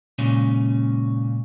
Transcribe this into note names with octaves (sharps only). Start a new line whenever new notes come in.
A#2 C#3 G#3 C#4